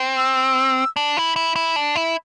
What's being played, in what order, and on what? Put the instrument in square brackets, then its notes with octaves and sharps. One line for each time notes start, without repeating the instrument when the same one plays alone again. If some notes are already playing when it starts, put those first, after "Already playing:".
Already playing: [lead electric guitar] C4
[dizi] E6
[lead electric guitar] D4
E4
E4
E4
D4
E4